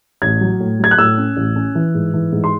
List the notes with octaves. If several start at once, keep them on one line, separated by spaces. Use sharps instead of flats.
A1 G#6
F#3
A2
F#3 G#6
F#6
A2 E6
C#4
A1
C#4
E3
G#2
E3
G#2
C6